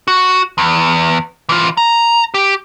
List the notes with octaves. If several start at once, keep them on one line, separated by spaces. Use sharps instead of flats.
F#4
E2
E3 F4
A#5
G4